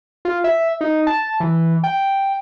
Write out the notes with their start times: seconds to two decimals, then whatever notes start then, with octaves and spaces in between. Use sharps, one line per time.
0.25 F4
0.44 E5
0.81 D#4
1.07 A5
1.40 E3
1.84 G5